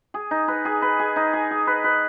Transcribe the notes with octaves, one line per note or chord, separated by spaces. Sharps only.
G#4
D#4
B4
G#4
B4
G#4
D#4
G#4
G#4
B4
B4